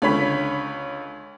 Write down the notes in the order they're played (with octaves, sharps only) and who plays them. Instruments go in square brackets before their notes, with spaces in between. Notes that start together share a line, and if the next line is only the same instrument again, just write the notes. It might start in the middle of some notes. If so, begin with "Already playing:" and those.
[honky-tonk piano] C#2 D3 C#5 B5 B6